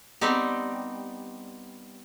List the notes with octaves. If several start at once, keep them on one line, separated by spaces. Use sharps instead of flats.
G3 B3 C4 D#4 G4